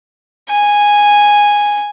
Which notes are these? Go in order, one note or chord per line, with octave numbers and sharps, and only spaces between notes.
G#5